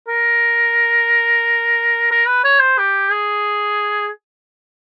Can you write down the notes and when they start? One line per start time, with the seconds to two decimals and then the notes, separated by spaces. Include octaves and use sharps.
0.08 A#4
2.11 A#4
2.27 B4
2.45 C#5
2.61 C5
2.79 G4
3.12 G#4